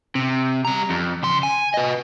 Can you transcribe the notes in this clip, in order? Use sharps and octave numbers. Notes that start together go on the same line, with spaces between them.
C3
G3 A#5
F2
C#3 C6
G#5
B4 D#5